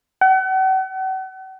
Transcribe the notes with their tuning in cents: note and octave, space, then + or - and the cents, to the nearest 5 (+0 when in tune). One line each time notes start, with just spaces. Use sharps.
F#5 +40